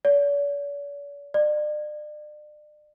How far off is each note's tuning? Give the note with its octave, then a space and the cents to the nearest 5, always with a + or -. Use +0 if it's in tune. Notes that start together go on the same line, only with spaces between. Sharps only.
D5 -45
D5 +40